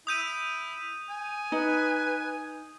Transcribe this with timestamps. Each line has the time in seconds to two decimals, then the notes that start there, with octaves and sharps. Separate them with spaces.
0.07 E4 D#6 G6 D#7
1.09 G#5
1.52 D#4 B4